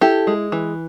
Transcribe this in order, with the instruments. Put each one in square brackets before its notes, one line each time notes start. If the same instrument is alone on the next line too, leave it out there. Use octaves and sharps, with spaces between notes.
[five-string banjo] E4 G4 A4
G#3
E3